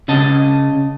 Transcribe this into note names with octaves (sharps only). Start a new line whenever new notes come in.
C#3 C#4 D#5 A5